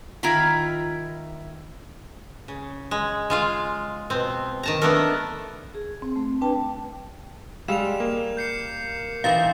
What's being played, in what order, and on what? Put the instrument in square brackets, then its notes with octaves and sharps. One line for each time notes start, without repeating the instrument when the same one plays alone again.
[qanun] D#3 F4 [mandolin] E4 A#5 B5
[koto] C#3
G#3
G#3 F4 F5
B2 C4
D#3 A5 A#5
A3 B3 D4 A4 A#4
[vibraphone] G#4
C4
A3
D4 B4 G5 A5
[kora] G3 [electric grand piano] G#3 F5 E6 [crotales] E7 F7
[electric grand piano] A#3
[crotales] G6 C7 C#7
[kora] E3 C4 D#4 [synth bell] F5 A6